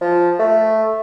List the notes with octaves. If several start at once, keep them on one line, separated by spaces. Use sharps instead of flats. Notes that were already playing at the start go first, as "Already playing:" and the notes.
F3
A3